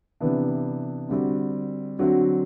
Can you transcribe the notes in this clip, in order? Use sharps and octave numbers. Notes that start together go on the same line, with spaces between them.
C3 E3 B3 D4
D3 G3 C4 F#4
D3 F#3 C4 F#4